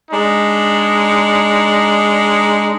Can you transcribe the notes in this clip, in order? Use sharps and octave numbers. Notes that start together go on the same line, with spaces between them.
G#3 D4 D#4